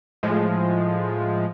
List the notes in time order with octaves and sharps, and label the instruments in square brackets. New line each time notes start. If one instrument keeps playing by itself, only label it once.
[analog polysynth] A2 F3 G#3